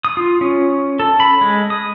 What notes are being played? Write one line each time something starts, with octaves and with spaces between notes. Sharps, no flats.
D#6
F4
C#4
A4
B5
G#3
D#6